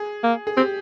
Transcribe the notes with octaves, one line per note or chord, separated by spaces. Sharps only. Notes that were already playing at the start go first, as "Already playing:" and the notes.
Already playing: G#4
A#3
G#4
C4 G4